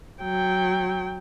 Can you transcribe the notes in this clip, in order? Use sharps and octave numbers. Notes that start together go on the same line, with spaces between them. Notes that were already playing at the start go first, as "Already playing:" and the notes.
F#3 G5